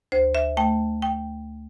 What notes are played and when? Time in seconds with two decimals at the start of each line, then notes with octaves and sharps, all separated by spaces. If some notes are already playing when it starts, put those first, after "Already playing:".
0.12 D2 C5
0.35 E5
0.57 A3 G5
1.02 G5